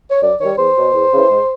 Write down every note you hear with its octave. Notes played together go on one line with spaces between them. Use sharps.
C#5
F#2 D5
D#3 G3 C#5
E2 C5
B2 F#3
E2
C#3 E3
G#2